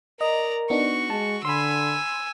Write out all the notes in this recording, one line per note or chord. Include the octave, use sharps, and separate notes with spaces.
A#4 D5 D#5 A#5
B3 D4 D#4 F#4 C#6
G#3 A5
D3 G#5 B5 C6 E6